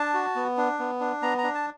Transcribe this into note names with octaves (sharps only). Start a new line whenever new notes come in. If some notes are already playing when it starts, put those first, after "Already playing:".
Already playing: D4 A5
F#4
B3
D4
B3
D4
B3 A#5
A#5
D4
A5